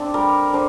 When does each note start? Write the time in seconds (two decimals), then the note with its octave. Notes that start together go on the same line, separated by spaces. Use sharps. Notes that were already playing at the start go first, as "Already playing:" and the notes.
Already playing: D3 C4 D4
0.14 G3 A#4
0.53 D3 C5